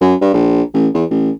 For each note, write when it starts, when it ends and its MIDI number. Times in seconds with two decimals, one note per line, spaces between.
0.01 0.14 42
0.21 0.30 43
0.34 0.62 34
0.74 0.88 33
0.94 1.05 40
1.10 1.30 33